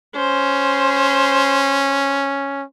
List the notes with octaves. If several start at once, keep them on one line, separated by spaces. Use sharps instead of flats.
C#4 C5